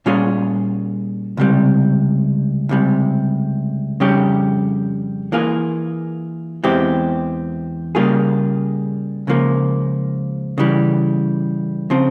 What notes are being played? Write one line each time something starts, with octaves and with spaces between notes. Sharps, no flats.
A#2 G3 C#4 F4 G#4
C#2 C3 G3
C#2 C3 G3
F2 C#3 G3 C#4 G4
E3 A#3 F4 G#4
E2 E3 G#3 C4 G4
C#3 G3 A#3 F4 G#4
C#2 C#3 F3 A#3
C#3 E3 G3
C#3 F3 C4